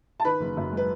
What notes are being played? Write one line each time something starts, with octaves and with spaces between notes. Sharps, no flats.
A5
D#3 B4 B5
F#1
F#2
G#3 B4